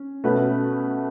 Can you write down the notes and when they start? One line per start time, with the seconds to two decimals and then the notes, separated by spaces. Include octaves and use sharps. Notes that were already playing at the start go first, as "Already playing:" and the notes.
Already playing: C#4
0.24 B2 A3 C#4 F#4 B4